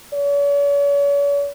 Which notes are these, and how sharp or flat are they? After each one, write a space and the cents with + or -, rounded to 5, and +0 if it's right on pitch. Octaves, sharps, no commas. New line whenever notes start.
C#5 +45